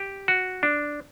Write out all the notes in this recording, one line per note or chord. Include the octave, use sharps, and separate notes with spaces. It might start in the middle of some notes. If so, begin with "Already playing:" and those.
Already playing: G4
F#4
D4